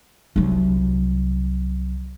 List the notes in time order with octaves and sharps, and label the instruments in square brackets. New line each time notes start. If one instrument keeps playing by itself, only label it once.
[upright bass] C2 F#3